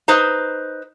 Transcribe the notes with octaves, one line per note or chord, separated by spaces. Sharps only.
D#4 B4 C5 A#5